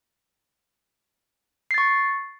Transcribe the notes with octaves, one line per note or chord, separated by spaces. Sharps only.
C#6 A6 C7